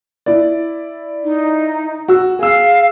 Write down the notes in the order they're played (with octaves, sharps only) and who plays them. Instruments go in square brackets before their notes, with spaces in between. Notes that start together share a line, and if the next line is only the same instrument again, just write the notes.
[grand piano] E4 D5
[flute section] D#4
[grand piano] F#4 E6
[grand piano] G#4 E6 [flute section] F5